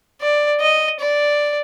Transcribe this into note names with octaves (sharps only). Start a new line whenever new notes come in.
D5
D#5
D5